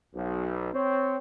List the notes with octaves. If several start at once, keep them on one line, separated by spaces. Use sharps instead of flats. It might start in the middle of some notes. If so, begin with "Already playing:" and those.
B1
C4 C#5